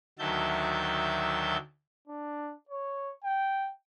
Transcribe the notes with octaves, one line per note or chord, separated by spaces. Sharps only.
D2 D#3 F#3 E5 A5 G6
D4
C#5
G5